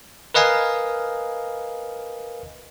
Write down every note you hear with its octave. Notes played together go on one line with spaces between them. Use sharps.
A#4 B4 D#5 F5 G#5